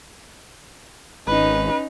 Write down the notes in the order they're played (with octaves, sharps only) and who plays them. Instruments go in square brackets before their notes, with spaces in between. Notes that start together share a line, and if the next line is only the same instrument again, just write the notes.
[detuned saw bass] G#1 [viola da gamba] C#4 D#4 [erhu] B4